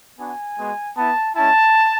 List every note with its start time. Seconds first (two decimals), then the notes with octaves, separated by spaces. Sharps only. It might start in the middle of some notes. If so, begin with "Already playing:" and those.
0.18 B3 D4 F#4 G#5
0.58 G#3 B3 F#4
0.97 B3 E4 A5
1.36 G#3 C#4 E4 A5